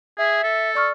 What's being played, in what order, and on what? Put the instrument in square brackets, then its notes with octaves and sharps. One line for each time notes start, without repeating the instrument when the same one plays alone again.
[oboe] G#4 [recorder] E5
[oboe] A4
[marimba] D5 C#6 F6